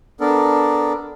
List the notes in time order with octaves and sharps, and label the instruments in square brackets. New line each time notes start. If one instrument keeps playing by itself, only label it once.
[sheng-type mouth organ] B3 D4 A4 A#4